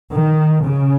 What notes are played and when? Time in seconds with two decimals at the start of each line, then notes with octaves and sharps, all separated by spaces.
0.13 D#3
0.63 C#3